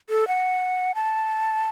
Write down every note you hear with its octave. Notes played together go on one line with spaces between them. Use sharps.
A4
F#5
A5